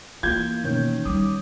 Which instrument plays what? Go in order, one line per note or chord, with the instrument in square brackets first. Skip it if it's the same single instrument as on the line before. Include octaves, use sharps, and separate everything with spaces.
[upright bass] E3 [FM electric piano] A#3 F4 [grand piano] G6 G#6
[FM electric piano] B2 A#3 G6 [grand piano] D#3 C#4
[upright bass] G3 D#4 [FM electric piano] D6 D#6